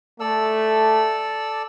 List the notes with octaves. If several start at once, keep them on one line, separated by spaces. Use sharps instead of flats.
A3 A4 D5 E6